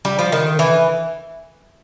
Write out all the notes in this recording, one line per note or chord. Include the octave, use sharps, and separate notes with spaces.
G3
F3
D#3
E3